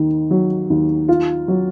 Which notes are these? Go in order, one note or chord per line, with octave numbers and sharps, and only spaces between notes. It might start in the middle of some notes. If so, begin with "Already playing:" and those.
Already playing: D#2 D#3
F#3
D#2
F4
F#3